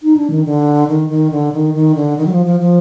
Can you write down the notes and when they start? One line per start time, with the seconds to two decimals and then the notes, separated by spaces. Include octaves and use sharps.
0.03 D#4
0.17 D4
0.30 D#3
0.45 D3
0.88 D#3
1.09 D#3
1.31 D3
1.53 D#3
1.74 D#3
1.95 D3
2.18 D#3
2.26 F#3
2.32 F3
2.45 F3
2.60 F3